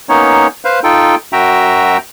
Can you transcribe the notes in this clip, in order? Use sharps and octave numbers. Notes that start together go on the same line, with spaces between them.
A#3 B3 C#4 D#4 C#5
B4 C5 F5
D#4 F4 A4 G5
F#2 F#4 E5 G5 A#5